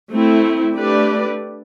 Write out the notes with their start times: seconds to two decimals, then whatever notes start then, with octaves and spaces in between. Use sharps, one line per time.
0.12 A3 C4 E4
0.75 A3 D4 G4 B4 D5